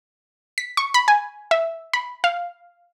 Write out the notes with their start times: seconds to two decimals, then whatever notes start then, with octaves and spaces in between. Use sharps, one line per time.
0.58 B6
0.77 C#6
0.94 B5
1.08 G#5
1.51 E5
1.93 B5
2.24 F5